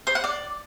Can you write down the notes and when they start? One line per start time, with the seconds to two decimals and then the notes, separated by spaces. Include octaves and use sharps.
0.07 C5
0.15 F#5
0.24 D5